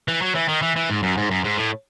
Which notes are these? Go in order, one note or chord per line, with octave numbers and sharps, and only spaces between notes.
E3
F#3
E3
D#3
E3
E3
G#2
F#2
G#2
F#2
G#2
A2